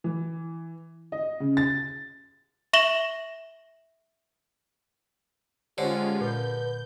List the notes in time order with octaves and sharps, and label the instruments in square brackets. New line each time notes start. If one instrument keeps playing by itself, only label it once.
[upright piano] E3
D#5
C#3
A6
[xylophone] E5 C#6 A#6 E7 F#7 G7
[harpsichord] D3 [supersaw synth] G#3 C#4 F4 [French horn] G4 [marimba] C5 C#5
[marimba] A#2 [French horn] B4 [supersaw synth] G6